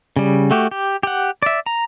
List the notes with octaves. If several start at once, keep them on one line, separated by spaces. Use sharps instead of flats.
C#3 G3
A3 F#4 G4
G4
G4 F#5
D5 E5
A#5